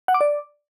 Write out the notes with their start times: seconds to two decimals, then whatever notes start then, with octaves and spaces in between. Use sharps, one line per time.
0.08 F#5
0.14 D6
0.21 D5